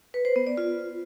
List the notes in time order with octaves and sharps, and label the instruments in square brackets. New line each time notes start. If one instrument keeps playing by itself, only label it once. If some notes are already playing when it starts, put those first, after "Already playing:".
[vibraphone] B4
C5
B3
D5
F4